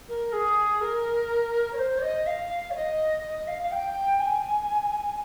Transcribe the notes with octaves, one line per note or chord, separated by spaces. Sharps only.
A#4
G#4
A#4
C#5
C5
C#5
D#5
F5
C#5
D#5
D#5
F5
F5
G5
G#5